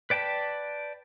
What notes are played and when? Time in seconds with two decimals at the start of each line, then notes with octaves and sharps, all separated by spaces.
0.10 B4 D5 G5 A5 B5